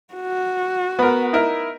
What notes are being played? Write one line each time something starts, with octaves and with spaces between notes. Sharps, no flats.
F#4
B3 A#4
D#4 E4 A#4